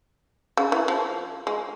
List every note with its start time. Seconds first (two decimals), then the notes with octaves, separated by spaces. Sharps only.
0.57 C#3
0.72 E3
0.88 F3
1.47 G#3